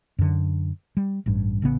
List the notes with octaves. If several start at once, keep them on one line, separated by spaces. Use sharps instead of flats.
F#2 D3
G3
A1 G2
A1 C#3 B3